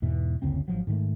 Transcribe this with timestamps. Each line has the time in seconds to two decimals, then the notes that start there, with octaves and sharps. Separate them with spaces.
0.02 E2 G#2 B2 E3
0.42 F#1 D2 C#3 C4
0.68 G#1 F3 F#3
0.87 G#2 D#3 E3 A3